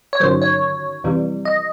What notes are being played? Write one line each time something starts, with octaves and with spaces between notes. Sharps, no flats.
C#5
G1 F#2 D#3 F#3 C5
C#5
F2 C3 E3 G3
D#5